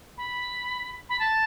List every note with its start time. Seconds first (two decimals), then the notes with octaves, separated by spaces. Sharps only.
0.18 B5
1.09 B5
1.20 A5